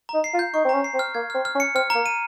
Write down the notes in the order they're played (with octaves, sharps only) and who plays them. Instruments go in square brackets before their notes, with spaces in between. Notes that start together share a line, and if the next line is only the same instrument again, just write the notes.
[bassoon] D#4 [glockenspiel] A#5
[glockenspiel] C7
[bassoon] F4
[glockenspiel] G6
[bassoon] D#4 [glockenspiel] C#6
[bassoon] C4
[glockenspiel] A#5
[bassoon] C#4
[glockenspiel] C7
[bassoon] C4
[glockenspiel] F6
[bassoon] A#3 [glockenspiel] G#6
[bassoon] C4 [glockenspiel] F6
[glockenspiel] F6
[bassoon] C#4
[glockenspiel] C#7
[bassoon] C4 [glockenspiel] F6
[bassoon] A#3 [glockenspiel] A#5
[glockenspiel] D#7